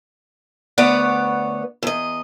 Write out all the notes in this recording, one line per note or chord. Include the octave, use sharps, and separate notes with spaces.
D2 B3 B4 C#5 D5 F#5
E2 D#5